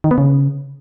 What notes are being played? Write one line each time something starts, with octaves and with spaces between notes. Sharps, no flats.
D#3
B3
C#3